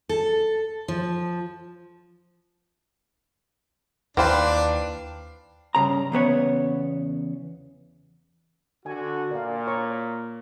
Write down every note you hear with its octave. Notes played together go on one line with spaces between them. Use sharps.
A4
F3
D#2 E3 D4 B4 C5 F5 G5
G2 C#3 A#5
E2 C#3 B3 C#5
D3 F#4 G#5
A#2 A#4 D5 F5
C#5 A#5 C#6